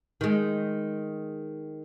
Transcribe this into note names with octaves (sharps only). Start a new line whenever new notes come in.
D#3 G#3